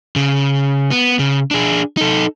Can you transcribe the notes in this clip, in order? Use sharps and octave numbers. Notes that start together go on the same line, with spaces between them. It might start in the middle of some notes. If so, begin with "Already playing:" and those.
C#3
B3
C#3
D4 G#4
D#4 A4